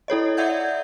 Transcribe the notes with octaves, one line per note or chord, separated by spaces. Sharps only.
E4 A4 C#5 D#5
D5 E5 F#5 G6 G#6